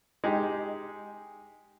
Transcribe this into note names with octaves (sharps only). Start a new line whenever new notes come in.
G#3 D#4 G4